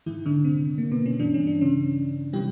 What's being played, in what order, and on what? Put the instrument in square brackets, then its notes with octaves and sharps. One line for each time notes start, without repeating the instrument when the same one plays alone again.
[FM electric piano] G#2 D#3 E3 E4
D3 D4
C3 C4
A#3
B2 B3
C#4
G2 E3 D4
C#4
D4
C#3 C#4
C3 E3 G3 G4